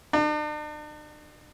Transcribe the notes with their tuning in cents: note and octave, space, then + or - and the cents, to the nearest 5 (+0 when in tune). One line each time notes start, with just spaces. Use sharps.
D4 +45